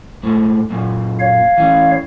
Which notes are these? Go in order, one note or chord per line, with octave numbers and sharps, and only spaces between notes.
G#2 A3
F#2 A#2
C#5 F5
E3 C#4